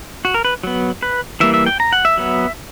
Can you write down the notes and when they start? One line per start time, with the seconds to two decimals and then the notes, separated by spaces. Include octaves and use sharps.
0.25 F#4
0.34 A#4
0.45 B4
0.63 F#3 B3
1.03 B4
1.40 E3 G3 A#3 E5
1.54 E5
1.66 G5
1.80 A#5
1.93 F#5
2.05 E5
2.17 F#3 B3